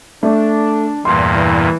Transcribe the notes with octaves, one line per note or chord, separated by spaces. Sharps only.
A3 D4
E2 G2 A#2 C6
E3